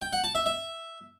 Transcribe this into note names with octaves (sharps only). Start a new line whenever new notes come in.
G5
F#5
A5
E5
E5